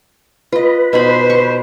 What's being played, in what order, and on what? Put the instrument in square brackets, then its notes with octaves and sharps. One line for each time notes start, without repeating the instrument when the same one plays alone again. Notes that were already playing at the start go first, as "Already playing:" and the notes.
[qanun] F4 D#5 [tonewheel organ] B4
[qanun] B2 D#4 B5 [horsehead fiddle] C5
[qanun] C#6